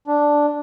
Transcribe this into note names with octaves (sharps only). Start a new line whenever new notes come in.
D4